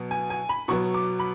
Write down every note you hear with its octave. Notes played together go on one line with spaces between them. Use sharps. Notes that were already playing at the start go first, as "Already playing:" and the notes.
Already playing: B2 F#3 B3
G#5
G#5
B5
B2 F#3 B3 C#6
D6
B5